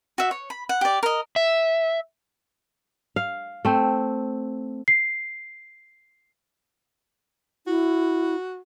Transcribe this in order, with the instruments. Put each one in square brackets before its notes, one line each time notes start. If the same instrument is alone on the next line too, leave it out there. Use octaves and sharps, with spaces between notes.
[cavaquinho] F#4 E5
C#5
B5
F#5
G4 D5
A#4 D#5
[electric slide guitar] E5
[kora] F5
A3 C4
[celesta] C7
[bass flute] E4 [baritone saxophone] F#4